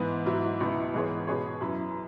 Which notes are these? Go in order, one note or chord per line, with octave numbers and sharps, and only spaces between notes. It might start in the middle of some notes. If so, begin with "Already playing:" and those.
Already playing: G#2 E3 B3
G#2 F#3 E4
C#2 B2 F#3 B3 E4
G#2 E3 B3 G#4 C#5
B2 B3 G#4 C#5
F#2 F#3 E4 B4